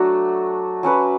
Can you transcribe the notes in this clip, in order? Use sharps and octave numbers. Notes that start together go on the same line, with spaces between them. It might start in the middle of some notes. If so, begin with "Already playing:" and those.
Already playing: F#3 A3 D4 F#4
F#3 C#4 F#4 B4